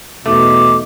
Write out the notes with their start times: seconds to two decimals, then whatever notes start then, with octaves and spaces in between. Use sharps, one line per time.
0.26 E2 B2 A3 D#4 D6